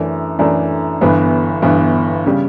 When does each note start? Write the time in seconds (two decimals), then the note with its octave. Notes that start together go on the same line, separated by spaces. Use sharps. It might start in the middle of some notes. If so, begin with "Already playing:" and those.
Already playing: F#2 E3 A3 D4 A4
0.39 F#2 E3 A3 D4 A4
1.01 G1 G2 E3 B3
1.62 G1 G2 E3 B3
2.26 C#3 G3